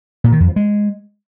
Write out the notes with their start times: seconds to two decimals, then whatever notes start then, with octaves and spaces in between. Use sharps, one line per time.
0.24 A#2
0.32 D#3
0.40 F2
0.48 F3
0.56 G#3